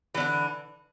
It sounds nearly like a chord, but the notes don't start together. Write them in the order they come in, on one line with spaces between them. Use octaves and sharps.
E3 D3 D4